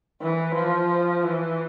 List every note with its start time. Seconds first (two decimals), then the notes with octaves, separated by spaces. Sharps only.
0.22 E3
0.55 F3
1.23 E3